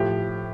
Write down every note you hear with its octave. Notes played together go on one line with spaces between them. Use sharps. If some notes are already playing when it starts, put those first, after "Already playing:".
Already playing: A2 F3 G4